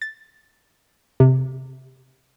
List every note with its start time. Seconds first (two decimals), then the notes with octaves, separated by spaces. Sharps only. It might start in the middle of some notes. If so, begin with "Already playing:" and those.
0.02 A6
1.20 C3